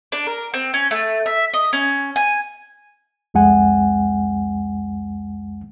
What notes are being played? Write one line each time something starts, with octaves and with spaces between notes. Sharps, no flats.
D4
A#4
C4
C#4
A3
E5
D#5
C#4
G#5
C2 F2 G#3 F#5 G#5